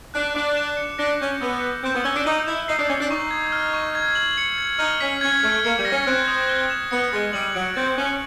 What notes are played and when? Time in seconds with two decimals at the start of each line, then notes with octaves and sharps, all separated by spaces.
0.14 D4 F#6
0.35 D4 D6
0.57 E7
0.77 C#7
0.98 D4 A#6
1.20 C#4 G6
1.41 B3 E6
1.62 B6
1.84 C4 G6
1.94 B3
2.04 C#4 E6
2.15 D4
2.25 D#4 G7
2.46 E4 E7
2.67 D#4 C7
2.79 D4
2.88 C#4 A6
2.99 D4
3.10 D#4 C#6
3.31 G#6
3.52 F6
3.74 C#6
3.95 G#6
4.15 F#7
4.38 C#7
4.58 G#6
4.79 D#4 F6
5.00 C#4 B6
5.21 C#4 G#6
5.43 A3 F6
5.64 A#3 C#7
5.78 G3
5.85 A#6
5.92 C#4
6.06 C4 F#6
6.28 D#6
6.49 G7
6.70 E7
6.91 B3 C#7
7.12 G#3 A6
7.33 G3 F#7
7.54 F#3 D7
7.76 C4 A6
7.97 C#4 F#6